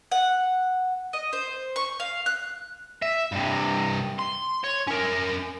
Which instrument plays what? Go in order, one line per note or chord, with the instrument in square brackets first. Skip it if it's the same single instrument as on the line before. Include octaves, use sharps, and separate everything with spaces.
[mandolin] F#5
D#5
C5
C#6
F5
F#6
[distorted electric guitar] E5
G2 C3
C6
C#5
C#4 A#4